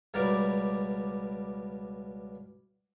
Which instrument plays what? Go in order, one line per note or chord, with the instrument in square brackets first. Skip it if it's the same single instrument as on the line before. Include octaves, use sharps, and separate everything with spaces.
[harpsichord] C#2 B2 G3 A#4 D5